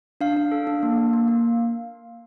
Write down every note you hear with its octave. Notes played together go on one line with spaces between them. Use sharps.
D4 F5
D4
A4
D4
A#3
A#3
A#3
A#3